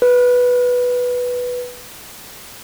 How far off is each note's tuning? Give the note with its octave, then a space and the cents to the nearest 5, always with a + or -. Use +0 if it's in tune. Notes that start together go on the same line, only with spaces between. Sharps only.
B4 -5